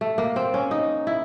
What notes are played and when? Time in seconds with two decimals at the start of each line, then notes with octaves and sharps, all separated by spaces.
0.01 A3
0.18 A#3
0.36 C4
0.54 C#4
0.71 D#4
1.07 E4